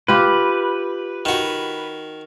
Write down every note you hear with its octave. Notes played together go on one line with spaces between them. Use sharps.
F4 G4 B4
D#3 F#4